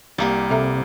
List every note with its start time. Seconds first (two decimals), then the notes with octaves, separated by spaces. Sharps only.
0.18 C2 G3 A#3 G4
0.50 C3 A4 E5 A#5